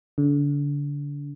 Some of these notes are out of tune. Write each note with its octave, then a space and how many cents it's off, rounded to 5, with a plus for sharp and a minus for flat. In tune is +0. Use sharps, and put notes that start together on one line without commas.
D3 -30